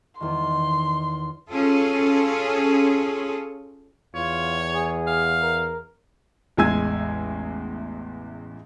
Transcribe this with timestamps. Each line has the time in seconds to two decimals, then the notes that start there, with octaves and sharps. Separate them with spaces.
0.20 E2 D#3 C6
1.51 C#4 F4 G#4 A4
4.15 E2 F4 C#5
4.74 G#4
5.07 F5
5.42 A#4
6.57 A1 E2 G#3 G#5 E6 G#6